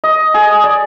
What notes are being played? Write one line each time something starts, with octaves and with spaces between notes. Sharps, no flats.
D#5
G#4
D5